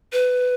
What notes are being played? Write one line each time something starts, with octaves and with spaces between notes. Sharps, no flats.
B4